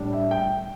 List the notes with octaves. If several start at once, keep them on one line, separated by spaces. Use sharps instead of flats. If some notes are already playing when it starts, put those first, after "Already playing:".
Already playing: A2 G3 D4
E5
G5